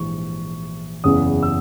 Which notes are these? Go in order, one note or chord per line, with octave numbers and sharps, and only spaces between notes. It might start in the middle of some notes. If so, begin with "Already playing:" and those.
Already playing: A#1 G#2 E3 C#6
F#1 E2 C#3 E3 D#6
E6